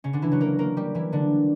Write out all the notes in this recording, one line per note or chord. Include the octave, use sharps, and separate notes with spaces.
C#3 C#4
D3 D4
E3 E4
F#3 F#4
A#3 A#4
A#3 A#4
G3 G4
E3 E4
D3 D4